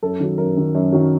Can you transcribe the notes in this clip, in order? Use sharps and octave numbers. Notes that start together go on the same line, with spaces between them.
F#2 A4
D#3 F#3
F#2 A#4
D#3 F#3
F#2
D#3 F#3